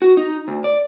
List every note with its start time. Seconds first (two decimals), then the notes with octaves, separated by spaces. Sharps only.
0.02 F#4
0.17 D#4
0.48 D2
0.64 D5